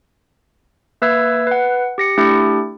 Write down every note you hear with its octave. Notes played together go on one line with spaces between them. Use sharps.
A#3 B4 E5 E6 G#6
B4 F#5
G4 A#6 C#7
A3 D4 E4 G4